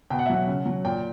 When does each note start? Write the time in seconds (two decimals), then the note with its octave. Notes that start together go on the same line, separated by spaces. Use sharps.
0.10 B2 G5
0.19 F#5
0.26 E5
0.30 F#3 F#5
0.47 C#3
0.66 F#3
0.85 A#2 G5